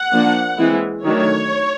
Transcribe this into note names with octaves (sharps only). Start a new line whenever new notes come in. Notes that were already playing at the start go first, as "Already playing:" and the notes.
Already playing: F#5
F3 A#3 D4
E3 G#3 C4 E4
D#3 F#3 A3 D4 C#5